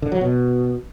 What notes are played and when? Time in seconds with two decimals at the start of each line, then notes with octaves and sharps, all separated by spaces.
0.02 D3
0.12 F#3
0.21 B2